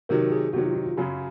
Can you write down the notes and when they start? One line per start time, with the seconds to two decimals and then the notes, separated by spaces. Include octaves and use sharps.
0.09 C3 D#3 F#3 A#4
0.32 G#4
0.53 C3 D#3 F#3 F#4
0.65 F4
0.75 D#4
0.86 F4
0.97 F#2 C#3 F#3 F#4